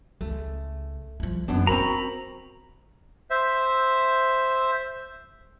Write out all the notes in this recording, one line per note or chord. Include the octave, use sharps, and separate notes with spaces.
C#2 A3
F3 G3
F#2 A#3 B3 D4 D#4
F#1 C4 D4 F#4 A#4 A#5 B5
C5 E5